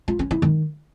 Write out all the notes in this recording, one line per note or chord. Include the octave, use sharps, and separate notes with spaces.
F4
C#4
E4
D#3